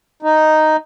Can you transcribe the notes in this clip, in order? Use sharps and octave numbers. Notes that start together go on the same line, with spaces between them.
D#4